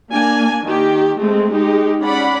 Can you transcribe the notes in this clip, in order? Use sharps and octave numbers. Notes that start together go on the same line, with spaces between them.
A#3 D4 G#5
D#3 G4
G#3 A3 C4
G#3 D#4 G4
C#4 D5 F#5 B5